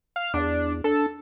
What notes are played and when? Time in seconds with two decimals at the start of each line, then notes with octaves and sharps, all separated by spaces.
0.16 F5
0.34 E2 D4
0.84 D4 A4